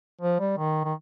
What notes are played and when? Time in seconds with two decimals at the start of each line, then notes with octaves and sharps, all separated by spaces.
0.21 F3
0.40 G3
0.58 D#3
0.84 D#3